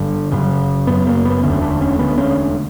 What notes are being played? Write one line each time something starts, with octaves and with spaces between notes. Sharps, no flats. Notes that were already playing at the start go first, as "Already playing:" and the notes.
Already playing: G1 G2 D3
F#1 F#2 C#3
F#1 F#2 C#3 B3
A#3
B3
E1 D2 D3 C#4
D4
C#4
E1 D2 D3 B3
C#4